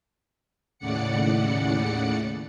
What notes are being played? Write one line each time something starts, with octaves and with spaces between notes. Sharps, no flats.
D#2 A2 C#3 D5 F#5 C#7